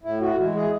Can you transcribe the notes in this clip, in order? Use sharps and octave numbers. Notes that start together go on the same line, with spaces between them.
A2 E4
F#4
E3 G#3 E4
G#4